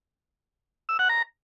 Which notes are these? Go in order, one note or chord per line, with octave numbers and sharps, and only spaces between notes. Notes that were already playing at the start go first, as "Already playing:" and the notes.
E6
F#5
A#5